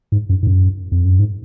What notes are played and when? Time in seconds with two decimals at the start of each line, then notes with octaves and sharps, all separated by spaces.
0.12 G#2
0.29 F#2
0.43 G#2
0.47 F#2
0.92 F2
1.05 F#2
1.19 G#2